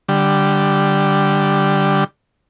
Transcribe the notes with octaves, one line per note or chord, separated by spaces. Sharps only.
D3 G3